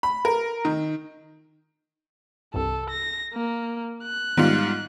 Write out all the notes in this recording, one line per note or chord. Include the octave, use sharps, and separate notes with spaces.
B5
A#4
D#3
C2 G2 A4
A#6
A#3
F#6
G#2 D#3 G3 B3 F4